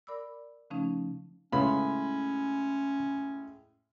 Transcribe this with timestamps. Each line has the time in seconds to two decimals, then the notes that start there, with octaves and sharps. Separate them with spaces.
0.07 A#4 D5 B5 D6 E6
0.70 C#3 F3 A3 C#4 D#4
1.52 A2 C#3 G#3 B3 C#4 F4 B5